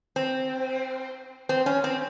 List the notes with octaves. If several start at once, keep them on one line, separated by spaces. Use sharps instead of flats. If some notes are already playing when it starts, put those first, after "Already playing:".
C4
C4
C#4
C4